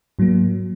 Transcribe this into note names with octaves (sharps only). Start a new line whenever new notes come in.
G#2 F#3 A#3